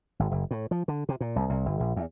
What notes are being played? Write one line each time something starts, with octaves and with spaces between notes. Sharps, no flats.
G#1
F#1
A2
F3
D3
C3
A#2
C2
C2
G1
A#1
E2